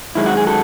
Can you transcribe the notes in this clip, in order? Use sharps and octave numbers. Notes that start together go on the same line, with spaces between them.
F#2 D#3 G#3 E4
F#4
G#4
F#4 A4